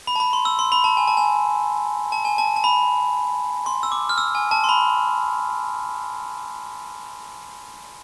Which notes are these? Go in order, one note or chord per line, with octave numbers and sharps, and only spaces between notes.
B5
A5
B5
C6
E6
C6
B5
A5
G#5
A5
G#5
A5
G#5
A5
A5
B5
C6
E6
D6
F6
E6
G#5
A5
C6
B5